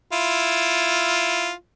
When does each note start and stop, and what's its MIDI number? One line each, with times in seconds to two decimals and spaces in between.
0.12 1.52 64
0.12 1.52 65